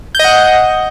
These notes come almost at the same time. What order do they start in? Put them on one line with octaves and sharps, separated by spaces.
G6 D#5 F#5